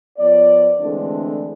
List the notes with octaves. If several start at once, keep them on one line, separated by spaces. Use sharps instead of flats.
F3 B3 C#5 D5
D3 E3 G#3 A3 C4 D4